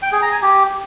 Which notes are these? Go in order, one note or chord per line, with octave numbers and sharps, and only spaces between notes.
G5
G#4
A#5
G#5
G4